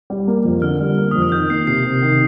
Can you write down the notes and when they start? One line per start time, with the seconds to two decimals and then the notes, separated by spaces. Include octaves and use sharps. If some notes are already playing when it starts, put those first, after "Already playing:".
0.10 G3
0.27 A#3
0.45 F2
0.62 D3 F6
0.80 G3
0.98 A#3
1.11 F2 D#6
1.22 F6
1.32 D#3 G6
1.50 A#3 C7
1.67 C3 C7
1.85 C3
2.02 D#3